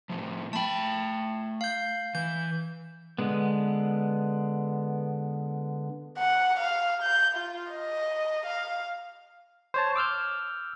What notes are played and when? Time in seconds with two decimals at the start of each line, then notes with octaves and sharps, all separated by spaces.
0.10 A2 F3
0.53 A3 G5 A5 B5
1.61 F5 G6
2.15 E3 G6
3.19 D3 G#3 B3
6.18 F#5
6.59 F5
7.02 G6
7.35 F4
7.71 D#5
8.46 F5
9.74 C5 C#5 A5
9.96 D6 E6 F6 G6